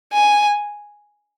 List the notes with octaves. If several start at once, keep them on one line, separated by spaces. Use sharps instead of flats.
G#5